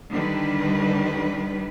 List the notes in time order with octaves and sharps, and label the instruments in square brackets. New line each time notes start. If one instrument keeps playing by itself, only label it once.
[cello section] D3 D#3 G3 B4